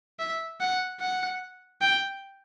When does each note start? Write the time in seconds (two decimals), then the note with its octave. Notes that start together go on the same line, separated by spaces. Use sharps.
0.19 E5
0.60 F#5
1.01 F#5
1.81 G5